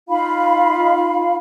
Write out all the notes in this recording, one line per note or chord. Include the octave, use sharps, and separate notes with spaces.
D#4 F4 F5 B5